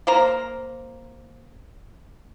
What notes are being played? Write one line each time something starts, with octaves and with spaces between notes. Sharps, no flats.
A#3 C5 A#5